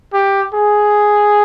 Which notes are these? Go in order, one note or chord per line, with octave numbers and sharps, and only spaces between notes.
G4
G#4